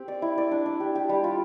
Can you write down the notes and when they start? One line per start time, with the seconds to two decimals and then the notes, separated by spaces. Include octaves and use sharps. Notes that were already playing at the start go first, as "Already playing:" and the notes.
Already playing: C4 G4
0.08 D5
0.22 E4
0.38 D5
0.51 D4
0.66 D4
0.80 G4
0.95 G4
1.09 G3
1.24 F4